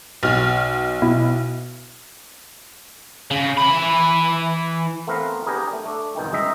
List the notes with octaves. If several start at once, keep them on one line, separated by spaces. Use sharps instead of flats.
B1 F6
B2 E4
C#3
E3 B5
A3 B3 C4 A#4 B4 F5
B3 D4 G4 G#4 A#4
A3
A3 D4
G1 E2 B2 D#3 G5
C#2 G#3 D#4 D#5 E5